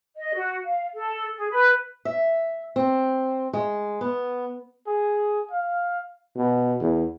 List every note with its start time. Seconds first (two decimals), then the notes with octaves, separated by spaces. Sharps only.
0.16 D#5
0.34 F#4
0.64 F5
0.94 A4
1.35 G#4
1.50 B4
2.05 E5
2.76 C4
3.53 G#3
4.01 B3
4.87 G#4
5.51 F5
6.36 B2
6.81 E2